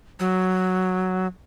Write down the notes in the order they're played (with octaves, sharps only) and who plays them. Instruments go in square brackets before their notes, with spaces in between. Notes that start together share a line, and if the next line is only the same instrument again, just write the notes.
[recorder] F#3